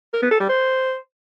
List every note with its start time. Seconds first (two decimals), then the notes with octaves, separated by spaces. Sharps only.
0.14 A#4
0.22 B3
0.31 A4
0.40 G3
0.49 C5